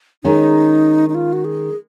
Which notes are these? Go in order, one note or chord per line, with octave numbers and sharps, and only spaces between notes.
D#3 G#3 C#4 D#4
D#4
F4
F#4
G#4